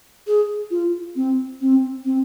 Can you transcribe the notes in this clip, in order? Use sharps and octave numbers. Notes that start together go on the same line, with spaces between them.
G#4
F4
C4
C4
C4